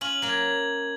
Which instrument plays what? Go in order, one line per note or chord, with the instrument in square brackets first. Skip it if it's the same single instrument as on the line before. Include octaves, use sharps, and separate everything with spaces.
[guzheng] C#4 F4 [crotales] F#7
[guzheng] F#3 A#3
[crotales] G#6